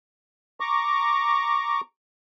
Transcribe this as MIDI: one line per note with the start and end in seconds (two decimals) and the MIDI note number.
0.60 1.81 82
0.60 1.81 85
0.60 1.81 86